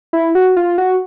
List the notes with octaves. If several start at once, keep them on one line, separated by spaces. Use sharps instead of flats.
E4
F#4
F4
F#4